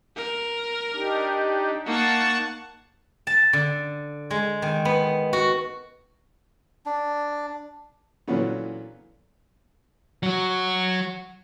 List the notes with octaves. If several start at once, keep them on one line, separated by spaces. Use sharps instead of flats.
A#4
D4 D#4 G4
A#3 D#4 F#5 A5 C#6
A5
D3
G#3
D#3
B3
F#4
D4
A#2 D3 E3 F#3 B3 C#4
F#3 F#4